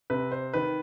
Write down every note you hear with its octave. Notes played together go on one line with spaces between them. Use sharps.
C3 B4
C5
D#3 B4